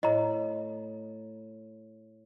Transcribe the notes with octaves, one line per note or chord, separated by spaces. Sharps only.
A2 D#5 A#5